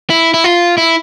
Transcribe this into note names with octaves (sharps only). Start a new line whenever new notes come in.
E4
E4
F4
E4